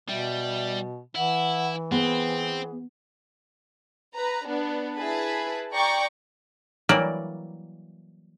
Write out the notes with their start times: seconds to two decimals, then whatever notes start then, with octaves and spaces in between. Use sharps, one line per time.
0.09 B2 G3 E5
1.15 E3 E4 F#5
1.92 B3 C4 G#4
4.13 B4 A#5
4.46 B3 D4
4.96 E4 G#4 B4 A5 B5
5.73 D5 G5 A#5 C#6 D6
6.89 E3 F#3 G3 A#3 A#4 D5